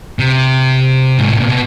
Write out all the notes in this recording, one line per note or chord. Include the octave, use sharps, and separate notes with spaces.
C3
G#2
A2
A#2
B2